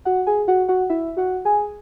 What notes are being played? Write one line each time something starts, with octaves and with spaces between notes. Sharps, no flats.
F#4 F#5
G#4 G#5
F#4 F#5
F#4 F#5
E4 E5
F#4 F#5
G#4 G#5